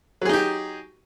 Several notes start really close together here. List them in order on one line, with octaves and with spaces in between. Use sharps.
F#3 G#4 D#4 G4